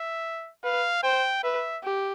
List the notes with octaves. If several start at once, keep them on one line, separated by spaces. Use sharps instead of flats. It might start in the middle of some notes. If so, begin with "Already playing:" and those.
Already playing: E5
B4 F5
C5 G5
B4 E5
G4